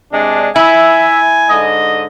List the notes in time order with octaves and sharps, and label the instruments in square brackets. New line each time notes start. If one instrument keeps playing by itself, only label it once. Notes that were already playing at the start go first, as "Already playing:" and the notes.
[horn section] C3 G#3 D4
[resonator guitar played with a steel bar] E4 [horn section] E5 [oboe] G#5
[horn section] G#2 D3 D#5